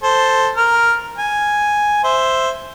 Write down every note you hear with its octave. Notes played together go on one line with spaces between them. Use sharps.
A4 C5
A#4 F6
G#5
C5 E5